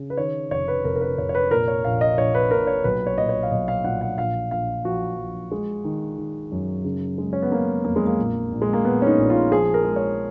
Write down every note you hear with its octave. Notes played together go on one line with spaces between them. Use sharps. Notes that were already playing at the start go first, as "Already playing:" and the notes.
Already playing: C#3
B4
D#3 C#5
F1 C#5
B4
F1 A#4
A#4
B4
F1 C#5
C#5
B4
A#2 A#4
C#5
A#1 F5
D#5
A#1 C#5
B4
A#2 A#4
C#5
B1 B4
C#5
A#2 D#5
C#5
F5
B1 D#5
F5
A#2 F#5
F#5
A#1 F5
A#1 F5
F3 F#4
F3
G#3
D#3
D#3
F#2
C#3
G#3
C#4
B3
G#3 A#3
F2 A#3
G#3
A#3
A#1
A#1
G#3
A#3
A#1 B3
C#4
D#4
A#1
F4
F3 G#4
A#4
G#3
C#5